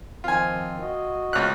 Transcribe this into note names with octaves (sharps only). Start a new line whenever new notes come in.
D#3 F3 C4 F4 G#5
F#4 D#5
C#2 F#6